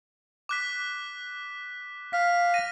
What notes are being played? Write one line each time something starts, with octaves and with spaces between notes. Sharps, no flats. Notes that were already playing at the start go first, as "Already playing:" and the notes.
D6 F#6 B6
F5 B6
A#6 D#7